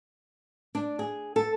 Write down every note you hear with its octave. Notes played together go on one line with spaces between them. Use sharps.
D4
G#4
A4